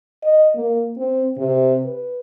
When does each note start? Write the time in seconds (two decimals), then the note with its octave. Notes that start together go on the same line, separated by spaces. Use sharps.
0.23 D#5
0.55 A#3
0.97 C4
1.38 C3
1.85 B4